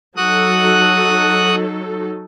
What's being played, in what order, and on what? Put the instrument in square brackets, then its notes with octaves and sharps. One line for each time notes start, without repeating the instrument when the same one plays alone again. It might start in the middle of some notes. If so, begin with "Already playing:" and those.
[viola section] F#3 D#4 A4 [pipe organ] F#4 D#6 F#6